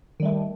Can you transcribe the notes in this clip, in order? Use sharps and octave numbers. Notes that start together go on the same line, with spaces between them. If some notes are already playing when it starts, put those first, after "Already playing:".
D#3 G3 A3